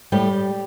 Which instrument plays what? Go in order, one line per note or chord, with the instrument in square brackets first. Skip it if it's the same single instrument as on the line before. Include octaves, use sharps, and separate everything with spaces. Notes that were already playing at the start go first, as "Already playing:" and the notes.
[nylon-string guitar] A2 G3 G4